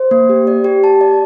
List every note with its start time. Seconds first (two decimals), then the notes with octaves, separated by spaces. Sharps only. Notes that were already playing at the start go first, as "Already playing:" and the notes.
Already playing: C5
0.11 A#3
0.29 G4
0.47 D5
0.64 G4
0.84 A5
1.01 D5